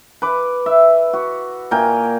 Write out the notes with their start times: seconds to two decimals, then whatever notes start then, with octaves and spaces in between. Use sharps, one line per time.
0.22 B4 D6
0.66 E5
1.14 F#4
1.71 A#2 A#4 G5 G#5